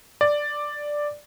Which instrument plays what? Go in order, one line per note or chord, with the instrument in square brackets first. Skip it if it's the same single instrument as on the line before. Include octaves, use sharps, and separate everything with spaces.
[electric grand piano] D5